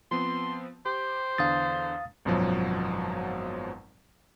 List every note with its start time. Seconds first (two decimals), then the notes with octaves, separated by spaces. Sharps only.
0.11 F3 B3 C4 C6
0.86 G4 C5
1.38 E2 D3 D4 F5 D#6 A6
2.25 G#1 F#2 B2 F3 F#3